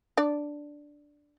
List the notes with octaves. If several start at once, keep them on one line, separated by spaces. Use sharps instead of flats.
D4 D5